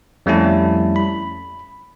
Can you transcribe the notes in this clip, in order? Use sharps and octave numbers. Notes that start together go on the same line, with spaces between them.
F2 G3 A3 C#4 E4 A5
B5